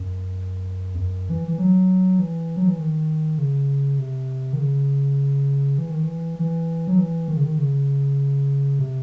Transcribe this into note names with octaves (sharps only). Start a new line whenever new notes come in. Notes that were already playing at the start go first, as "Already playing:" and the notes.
Already playing: F#2
E2
F#2
E3
E3
F#3
E3
F#3
E3
D#3
C#3
C3
D#3
C#3
E3
D#3
E3
E3
F#3
E3
D#3
C#3
D#3
C#3
C3